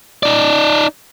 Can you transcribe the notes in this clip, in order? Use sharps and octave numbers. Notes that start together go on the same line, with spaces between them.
D#4 D5